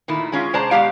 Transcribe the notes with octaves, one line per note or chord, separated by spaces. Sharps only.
A#2 D#3 A3 E4
G#3 C#4 F4
C3 G#3 C5 D5 A5 A#5
B2 F3 G#3 G4 F5